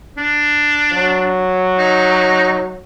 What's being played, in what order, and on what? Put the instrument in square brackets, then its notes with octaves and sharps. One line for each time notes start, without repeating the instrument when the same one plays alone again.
[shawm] D4
[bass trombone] F#3
[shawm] D#4